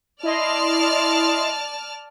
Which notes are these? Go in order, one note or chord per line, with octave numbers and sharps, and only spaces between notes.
E4 D5 D#5 A5 C6 F6